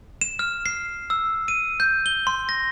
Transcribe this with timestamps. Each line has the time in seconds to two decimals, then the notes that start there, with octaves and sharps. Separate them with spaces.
0.21 E7
0.39 F6
0.66 C7
1.10 E6
1.48 D#7
1.80 G6
2.06 G7
2.27 C6
2.49 A#6